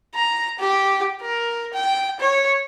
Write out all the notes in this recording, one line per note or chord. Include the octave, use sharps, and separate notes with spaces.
A#5
G4
A#4
G5
C#5